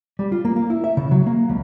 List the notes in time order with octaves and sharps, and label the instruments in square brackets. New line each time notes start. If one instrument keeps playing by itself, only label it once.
[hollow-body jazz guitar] G3
F4
A#3
A#3
E4
E5
C#3
F#3
A#3
C#2